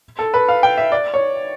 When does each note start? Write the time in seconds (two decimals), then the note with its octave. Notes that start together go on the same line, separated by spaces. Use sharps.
0.19 A4
0.34 B4
0.48 F5
0.63 G5
0.77 E5
0.92 D5
1.14 C#5